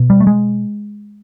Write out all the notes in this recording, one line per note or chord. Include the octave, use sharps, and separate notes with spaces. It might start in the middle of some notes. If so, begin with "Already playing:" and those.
Already playing: B2
G3
A3
G#3